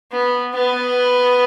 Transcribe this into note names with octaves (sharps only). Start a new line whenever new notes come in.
B3
B3